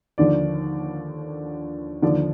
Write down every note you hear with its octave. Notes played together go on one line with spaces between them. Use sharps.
D#2 D3 F3 D5
D#2 D3 F3 D5